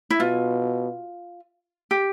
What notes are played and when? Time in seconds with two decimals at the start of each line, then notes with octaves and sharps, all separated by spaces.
0.10 E4
0.20 B2 F4
1.91 G4